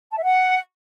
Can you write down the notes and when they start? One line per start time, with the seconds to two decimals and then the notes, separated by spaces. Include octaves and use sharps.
0.11 A5
0.17 E5
0.23 F#5